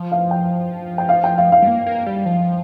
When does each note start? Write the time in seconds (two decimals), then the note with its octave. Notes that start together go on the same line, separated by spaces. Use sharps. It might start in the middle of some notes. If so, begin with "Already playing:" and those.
Already playing: F3
0.12 F5
0.31 G5
0.98 G5
1.09 F5
1.24 G5
1.38 F5
1.52 F5
1.62 G3
1.67 A#3
1.87 A#3
2.06 G3
2.26 F3